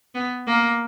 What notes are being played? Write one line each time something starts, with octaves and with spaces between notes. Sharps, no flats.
B3
A#3